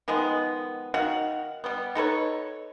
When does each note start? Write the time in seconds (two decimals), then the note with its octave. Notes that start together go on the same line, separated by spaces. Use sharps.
0.08 D#3 F3 G#3 B3
0.94 D#3 F#4 F5 F#5
1.64 G3 B3
1.95 D#4 A4 B4 C#5